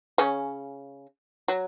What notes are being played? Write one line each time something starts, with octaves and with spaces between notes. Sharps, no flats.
C#3 C#4
F#3